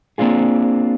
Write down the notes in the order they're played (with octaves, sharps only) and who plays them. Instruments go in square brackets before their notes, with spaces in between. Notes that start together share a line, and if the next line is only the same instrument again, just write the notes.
[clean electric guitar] A#3 C4 D4 F4 G#4